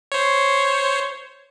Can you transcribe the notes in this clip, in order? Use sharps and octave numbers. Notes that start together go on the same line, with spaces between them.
C5 C#5